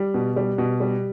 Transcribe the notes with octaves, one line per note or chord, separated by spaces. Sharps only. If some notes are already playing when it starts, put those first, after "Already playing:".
Already playing: G3
B2
G3
B2
G3